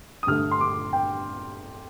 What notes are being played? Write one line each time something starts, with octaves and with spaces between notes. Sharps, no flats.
D#6
G2 D3 A3 F6
C6
D6
G5